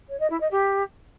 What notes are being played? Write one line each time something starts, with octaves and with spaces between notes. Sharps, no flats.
C#5
D#5
E4
D#5
G4